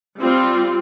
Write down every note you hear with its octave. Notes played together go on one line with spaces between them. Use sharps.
G3 C4 F4